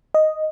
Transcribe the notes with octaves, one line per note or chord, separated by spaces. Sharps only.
D#5